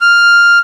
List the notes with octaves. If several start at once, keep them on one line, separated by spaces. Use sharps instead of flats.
F6